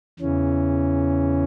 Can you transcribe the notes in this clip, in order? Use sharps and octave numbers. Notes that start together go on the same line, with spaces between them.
E2 C#3 E3 C#4